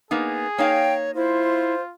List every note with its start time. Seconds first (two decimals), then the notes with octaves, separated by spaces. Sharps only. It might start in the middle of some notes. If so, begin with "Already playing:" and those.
0.11 A#3 B3 D#4 G#4
0.58 A#3 D#4 C#5 F5 G5
1.16 E4 F4 C5